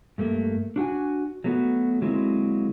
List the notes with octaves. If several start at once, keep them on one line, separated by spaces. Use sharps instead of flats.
G2 A3 A#3
D4 F#4 G5 G#5
F#3 A3 B3 F#4
D3 F#3 G#3 A#3 C4 E4